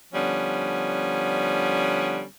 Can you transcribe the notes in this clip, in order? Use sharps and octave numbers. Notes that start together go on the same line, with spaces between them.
D3 F3 G3 B3 C#4